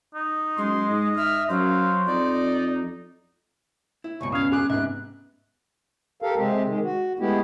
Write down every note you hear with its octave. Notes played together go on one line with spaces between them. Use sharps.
D#4
F#2 G#3 C6
G#2 D#5
E5 F6
F#2 F#3 C5 F5
F2 D#4 D5
E4
C#2 G2 B2 C#6
C#4 F5 D#6 G#6
G#4 D6 F#6
G#2 C3 B3 E5 F#6
G4 A4 A#4 F5
C3 G#3 C4 G4
D#3 G#3
F#4
G#3 A3 B3 E4 G4